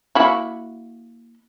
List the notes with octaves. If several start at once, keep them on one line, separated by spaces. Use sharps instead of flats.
A#3 E4 F#4